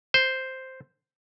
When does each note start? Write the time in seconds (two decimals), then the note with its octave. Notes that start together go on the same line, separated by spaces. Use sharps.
0.14 C5